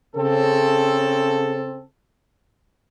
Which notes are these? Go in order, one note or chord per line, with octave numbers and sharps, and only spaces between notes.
C#3 C4 A4